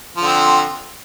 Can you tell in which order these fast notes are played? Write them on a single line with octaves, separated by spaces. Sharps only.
F3 D3 C4